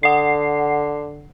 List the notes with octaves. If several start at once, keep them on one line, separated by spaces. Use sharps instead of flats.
D3 F#5 C7